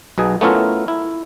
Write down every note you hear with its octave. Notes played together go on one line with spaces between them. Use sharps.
B1 B2 G#4
A3 B3 C#4 E4 F4 A#4
E4